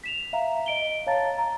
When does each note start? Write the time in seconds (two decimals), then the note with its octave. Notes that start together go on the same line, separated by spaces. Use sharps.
0.04 B6 E7 F7
0.33 E5 F5 A#5
0.66 D#5 D7 G7
1.07 C#5 F5 A5 A#5 A6
1.38 A#5